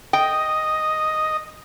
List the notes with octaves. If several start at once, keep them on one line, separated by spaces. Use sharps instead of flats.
D#5 G5